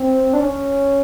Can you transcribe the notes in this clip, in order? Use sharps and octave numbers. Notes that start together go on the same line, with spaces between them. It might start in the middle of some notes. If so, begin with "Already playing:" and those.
Already playing: C4
D4
C#4